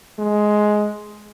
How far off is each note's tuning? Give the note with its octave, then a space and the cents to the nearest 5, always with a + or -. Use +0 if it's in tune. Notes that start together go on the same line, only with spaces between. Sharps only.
G#3 +10